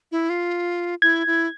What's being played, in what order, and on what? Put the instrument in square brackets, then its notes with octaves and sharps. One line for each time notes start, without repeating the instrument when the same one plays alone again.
[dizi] E4
F4
[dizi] E4 [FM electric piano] G#6
[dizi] E4